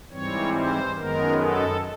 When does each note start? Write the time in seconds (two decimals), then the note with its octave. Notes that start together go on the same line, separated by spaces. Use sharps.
0.11 G#2 E3 G3 C4 C#5
0.54 C5
0.96 F#2 D#3 G#3 B3 A#4
1.39 A4